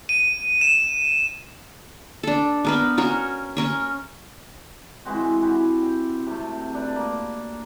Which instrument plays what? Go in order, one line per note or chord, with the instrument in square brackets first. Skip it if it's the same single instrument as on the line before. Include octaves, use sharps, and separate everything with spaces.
[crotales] D#7
E7
[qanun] D4 A4
B3 A#4 B4
C#4 F#4 A#4 C#5
C#4 A#4 C#5
[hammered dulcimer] E3 G#3 C4 F#4
E4 F#4 G4
G5
C3 A3
D4 B4
A#3